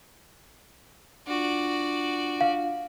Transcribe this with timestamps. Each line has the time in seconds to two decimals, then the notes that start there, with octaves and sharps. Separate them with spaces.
1.27 D4 F4 F#4 D5
2.41 F5